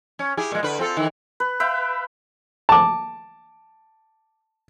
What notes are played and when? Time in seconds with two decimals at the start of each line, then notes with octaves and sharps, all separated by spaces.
0.19 C#4
0.37 E4 G4 G#4
0.52 A#2 G#3
0.63 D3 B4
0.79 C4 F4 A4
0.97 D#3 E3
1.40 B4
1.60 B4 E5 F5 G5
2.69 A5 D6